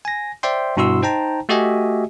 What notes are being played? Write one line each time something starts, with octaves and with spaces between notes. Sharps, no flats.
G#5 A#6
C5 D5 E5 G5 C6
G2 B2 E4 F#4 C6 E6
D#4 C5 G5 A5 A#5
A3 F#4 G4 D#5 E5 G#5